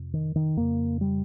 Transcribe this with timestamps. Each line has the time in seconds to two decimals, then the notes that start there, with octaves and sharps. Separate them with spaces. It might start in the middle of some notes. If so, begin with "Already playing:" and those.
Already playing: F2 C3
0.14 D#3
0.36 D#3
0.57 F2 C#3 A#3
1.01 G3